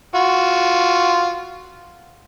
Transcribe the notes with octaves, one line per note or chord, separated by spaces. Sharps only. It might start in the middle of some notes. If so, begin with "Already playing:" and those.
F4 F#4